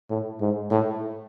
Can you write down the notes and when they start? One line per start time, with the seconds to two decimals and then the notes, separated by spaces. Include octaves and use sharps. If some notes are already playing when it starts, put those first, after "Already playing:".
0.10 A2
0.41 G#2
0.71 A2